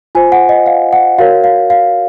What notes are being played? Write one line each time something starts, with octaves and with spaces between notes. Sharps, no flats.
F4 C5 G#5
F#5
D#5
F5
F#5
F#4 A#4 C#5 F5
F5
F5